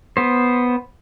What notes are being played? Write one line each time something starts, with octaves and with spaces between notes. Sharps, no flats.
B3 C5